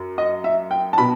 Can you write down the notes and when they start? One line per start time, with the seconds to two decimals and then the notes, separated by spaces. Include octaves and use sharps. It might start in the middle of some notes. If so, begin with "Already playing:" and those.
Already playing: F#2
0.18 D#5
0.44 E5
0.71 G5
0.93 A5
0.98 B2 B5